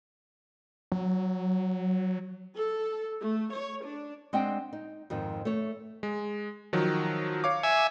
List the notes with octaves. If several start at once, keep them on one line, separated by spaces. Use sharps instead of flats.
F#3
A4
A3
C#5
D4
G#3 C4 D4 C5 F#5 G5
D#4
F2 G#2 D#3
A3 C#5
G#3
D#3 F3 F#3
C#5 F5 D6
E5 G#5